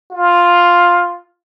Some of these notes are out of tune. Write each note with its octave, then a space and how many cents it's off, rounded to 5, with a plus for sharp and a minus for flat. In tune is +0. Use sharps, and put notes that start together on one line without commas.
F4 +5